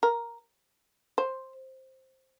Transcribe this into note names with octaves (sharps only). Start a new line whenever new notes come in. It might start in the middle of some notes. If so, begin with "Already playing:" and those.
A#4
C5